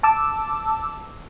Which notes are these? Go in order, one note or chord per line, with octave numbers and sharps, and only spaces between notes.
A5 D6 E6